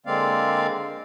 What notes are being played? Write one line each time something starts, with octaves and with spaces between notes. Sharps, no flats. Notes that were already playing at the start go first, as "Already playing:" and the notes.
D3 G#3 A#3 C4 D5 F5